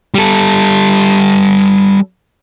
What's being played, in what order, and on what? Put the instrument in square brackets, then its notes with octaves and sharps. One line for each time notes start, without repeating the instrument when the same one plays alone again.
[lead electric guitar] G3 A4